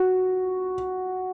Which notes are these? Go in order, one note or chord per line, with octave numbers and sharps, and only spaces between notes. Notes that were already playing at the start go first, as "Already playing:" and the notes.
Already playing: F#4